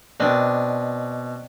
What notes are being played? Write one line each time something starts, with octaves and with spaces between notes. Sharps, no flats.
B2 C4 D4 D5 D#5